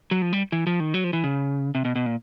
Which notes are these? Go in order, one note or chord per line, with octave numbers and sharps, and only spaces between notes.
F#3
F3
G3
E3
F3
D#3
F#3
F3
E3
C#3
C3
B2
B2
A#2